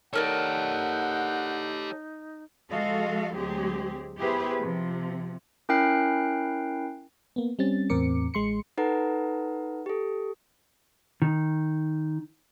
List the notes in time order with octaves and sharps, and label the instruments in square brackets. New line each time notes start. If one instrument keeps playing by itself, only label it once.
[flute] D#4 [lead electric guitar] G4 C#5 [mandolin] A4 A#4 D5 [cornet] F#5
[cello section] F3 G#3 F#4 A4 D#5 F5
D2 F#3 G#3 C4 G4 G#4
B3 E4 G4 G#4 B4 C5
C3 F3
[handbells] C#4 E4 A#4 G5 F#6 C7
[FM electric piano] A#3 B3
G3 C4 C#4 A6
E2 A2 C4 A#4 D6 C#7
A1 G#3 C6 C#7
[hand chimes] D#4 A4 B4 F#5 A#5
G4 A4
[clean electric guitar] D#3